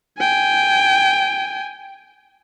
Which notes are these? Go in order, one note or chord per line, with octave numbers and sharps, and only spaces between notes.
G5 G#5